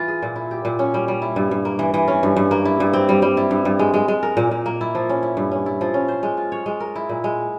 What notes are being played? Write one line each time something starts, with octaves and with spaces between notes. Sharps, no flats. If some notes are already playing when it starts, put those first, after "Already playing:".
Already playing: E3 F4
G#4
A#2
E4
G4
A#2
C#4
G3
G3
E4
G2
G2
A#3
E3
E3
C#4
G2
G2
A#3
E4
G2
C4
G3
G3
E4
G2
G2
G#3
G#3
G#3
A#4
A#2
A#2
A#3
E4
F3
C#4
E4
G2
C#4
E4
F3
C#4
C5
G#3
F4
C#5
G#3
A#4
E4
A#2
G#3